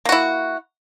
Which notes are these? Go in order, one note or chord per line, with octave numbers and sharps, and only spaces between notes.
A#3 E4 F#4